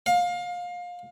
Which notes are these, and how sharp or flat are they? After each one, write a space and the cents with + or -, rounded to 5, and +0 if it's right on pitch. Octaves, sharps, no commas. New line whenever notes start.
F5 +25